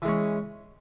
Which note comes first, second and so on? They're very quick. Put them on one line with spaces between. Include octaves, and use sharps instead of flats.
E3 G#3 C#4